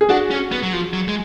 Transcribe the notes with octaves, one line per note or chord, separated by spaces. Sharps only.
G#4
D4 F#4
C#4
B3
F#3
F3
F#3
G#3